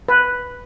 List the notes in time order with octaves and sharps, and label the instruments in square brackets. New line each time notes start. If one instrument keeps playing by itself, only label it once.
[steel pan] B4